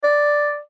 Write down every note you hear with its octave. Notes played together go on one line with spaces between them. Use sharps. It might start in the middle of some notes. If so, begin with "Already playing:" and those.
D5